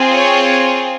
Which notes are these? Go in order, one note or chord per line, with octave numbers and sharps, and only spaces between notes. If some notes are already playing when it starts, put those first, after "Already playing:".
Already playing: C4 F4 G#4
C#5